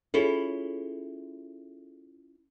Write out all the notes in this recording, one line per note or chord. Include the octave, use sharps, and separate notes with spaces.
C#4 E4 F4 G#4 A4